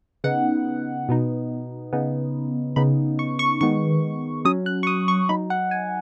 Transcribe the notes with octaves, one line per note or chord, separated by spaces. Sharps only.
C#3 B3 D#4 F#5
B2 B3 D#4
C#3 B3 D#4
C#3 B3 D#4 B5
C#6
C#6
D#3 G#3 B3 D#4 C#6
F#3 C#4 D#6
F#6
C#6
D#6
C#6
F#3 D#4 B5
F#5
G#5